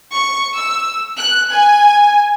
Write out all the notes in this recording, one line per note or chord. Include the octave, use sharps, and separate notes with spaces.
C#6
E6
F#6
G#5